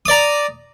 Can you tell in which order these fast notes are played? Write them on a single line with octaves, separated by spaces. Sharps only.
D#6 D5 A#5